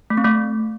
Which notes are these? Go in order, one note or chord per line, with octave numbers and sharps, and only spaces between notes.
A3
C4
A3